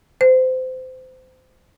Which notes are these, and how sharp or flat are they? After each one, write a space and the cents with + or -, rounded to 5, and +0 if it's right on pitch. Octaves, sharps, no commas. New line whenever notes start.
C5 -25